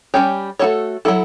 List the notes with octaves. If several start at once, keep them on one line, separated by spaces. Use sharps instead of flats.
G3 C#4 G4 C#5
A3 D4 F#4 A4 C#5
F#3 A3 E4 A4